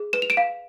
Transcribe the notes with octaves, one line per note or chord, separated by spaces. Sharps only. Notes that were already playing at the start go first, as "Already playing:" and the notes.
Already playing: G#4
B4 E7
F7
D7 E7
F5